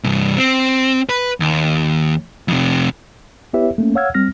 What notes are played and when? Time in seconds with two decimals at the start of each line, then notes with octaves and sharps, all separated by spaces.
0.04 C2 G2
0.37 C4
1.09 B4
1.40 D#2
2.48 F2 C3
3.53 B3 E4 G4 B4 C#5 E5
3.78 A3 A#3 C#4
3.95 C#5 F5 F#5 E6 F6 G#6
4.14 G3 C4 F6 A#6